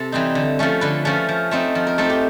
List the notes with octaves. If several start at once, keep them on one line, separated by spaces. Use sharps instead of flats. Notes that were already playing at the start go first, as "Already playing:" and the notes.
Already playing: C3 A4
E3 G3 C4 D#4
D3
F3 A3 C#4
D3 B4
F3 A3 C#4
F3
A3 C4 D#4
F3
A#4
A3 C4 D#4 A4
G4